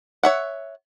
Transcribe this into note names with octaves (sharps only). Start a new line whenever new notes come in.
C#5 E5 F#5